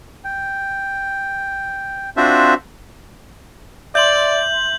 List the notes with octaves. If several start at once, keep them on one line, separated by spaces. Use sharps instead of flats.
G5
C4 D4 F4 F#4 C5 E5
D5 E5 C6 G6 F#7